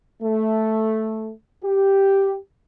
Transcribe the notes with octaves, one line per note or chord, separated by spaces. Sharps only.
A3
G4